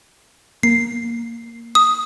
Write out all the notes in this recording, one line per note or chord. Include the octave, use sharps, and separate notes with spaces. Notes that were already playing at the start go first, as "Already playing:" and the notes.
A#3 C7
D#6